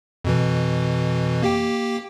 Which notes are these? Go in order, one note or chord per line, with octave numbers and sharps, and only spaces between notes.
F2 B2 E3
A#3 G4 G5